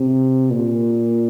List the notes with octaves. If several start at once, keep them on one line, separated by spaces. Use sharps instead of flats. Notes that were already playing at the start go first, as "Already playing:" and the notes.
Already playing: C3
A#2